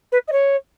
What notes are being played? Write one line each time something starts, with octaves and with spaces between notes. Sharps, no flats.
B4
D#5
C#5